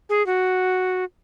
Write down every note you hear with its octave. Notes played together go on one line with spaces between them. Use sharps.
G#4
F#4